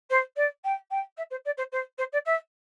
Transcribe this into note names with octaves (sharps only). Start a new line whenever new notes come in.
C5
D5
G5
G5
E5
C5
D5
C5
C5
C5
D5
E5